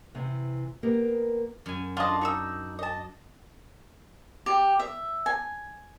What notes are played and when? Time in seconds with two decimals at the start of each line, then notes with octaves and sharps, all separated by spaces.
0.15 C3 E3
0.83 A#3 B3 G4 A#4
1.66 F#2 G#5
1.97 D4 F4 D#5 A5
2.21 D#4 C#6 E6
2.79 D#5 A5
4.46 G4
4.80 E5
5.26 G#5